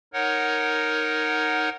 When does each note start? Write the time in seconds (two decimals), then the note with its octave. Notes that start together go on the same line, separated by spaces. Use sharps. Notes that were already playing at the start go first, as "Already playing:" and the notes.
0.13 D#4 A#4 C#5 F#5